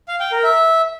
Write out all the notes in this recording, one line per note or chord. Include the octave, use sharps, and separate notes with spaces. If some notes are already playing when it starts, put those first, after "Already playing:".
F5
G5
A#4
E5